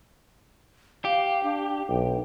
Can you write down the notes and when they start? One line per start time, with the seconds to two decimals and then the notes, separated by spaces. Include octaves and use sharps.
1.05 G4 F5
1.43 D4
1.88 B1 G5